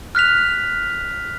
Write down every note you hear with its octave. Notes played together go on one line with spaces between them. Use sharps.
F6 F#6 B6 F7